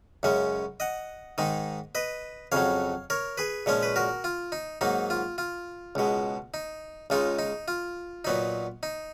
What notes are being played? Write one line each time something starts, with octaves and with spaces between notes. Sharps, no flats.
F#2 C#3 G#3 C#4
D#5 F#5
G#2 D#3 G#3 D#4
B4 D#5
F2 C#3 F#3 C#5 F5
A#4 C#5
G#4 B4
A#2 F3 G#3 C#4 C#5
B4
F#4 A#4
F4
D#4
G#2 F#3 A#3 D#4
F4
F4
C#2 B2 G#3
D#4
C#2 C#3 G#3 D#4 F4
D#4
F4
A#2 F#3 B3 D#4
D#4